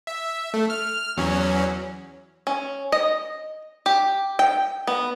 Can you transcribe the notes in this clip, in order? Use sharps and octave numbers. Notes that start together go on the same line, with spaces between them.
E5
A3
F6
E2 F#3 C#4
C#4
D#5
G4
G5
B3